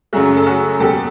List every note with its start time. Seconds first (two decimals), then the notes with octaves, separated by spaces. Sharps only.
0.13 F#2 C#3 F#3 A3 F#4 G#4
0.36 A4
0.47 F#4 G#4
0.79 E2 B2 F#3 A#3 G4 A4